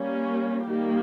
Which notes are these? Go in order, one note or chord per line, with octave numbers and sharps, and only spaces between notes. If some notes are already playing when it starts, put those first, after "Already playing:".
Already playing: G3 A#3 C#4
D#3 G3 A#3 G4